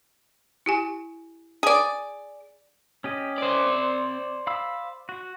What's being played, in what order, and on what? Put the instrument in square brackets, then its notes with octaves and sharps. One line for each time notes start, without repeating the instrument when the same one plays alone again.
[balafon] E4 G4 G#5
[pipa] G#4 D5
[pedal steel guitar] C#4 G4 D#5
[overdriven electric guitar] C5 D5
[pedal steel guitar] C4
F5 B5 E6
F#4